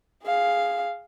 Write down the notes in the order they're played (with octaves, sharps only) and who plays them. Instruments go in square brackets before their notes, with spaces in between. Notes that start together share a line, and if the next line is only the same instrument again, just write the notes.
[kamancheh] G#4 F5